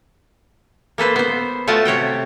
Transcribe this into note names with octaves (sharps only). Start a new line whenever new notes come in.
A#3 A4 B4 C5
B3 C5
A3 F4 F#4 D#5 G5 A5
C3 C#5 F#5 G5